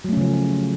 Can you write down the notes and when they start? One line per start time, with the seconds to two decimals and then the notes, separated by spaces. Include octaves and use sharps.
0.04 F#3
0.09 A3
0.13 C#4
0.17 C#3
0.21 F3